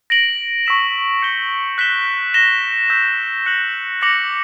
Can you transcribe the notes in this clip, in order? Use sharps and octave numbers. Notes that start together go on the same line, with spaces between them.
A#6 D7 F#7
C#6 E6 B6 E7
G6 C#7 E7 G7
F#6 B6 E7 G7
A#6 E7 G7
E6 G6 B6
F#6 A#6 C#7 F#7
D6 A#6 C#7 F#7